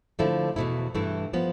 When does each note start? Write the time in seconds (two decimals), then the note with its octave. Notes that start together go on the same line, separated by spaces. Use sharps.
0.19 D3 F3 A3 E4
0.56 E2 B2 A3 E4
0.94 G2 E3 A3 E4
1.33 F3 B3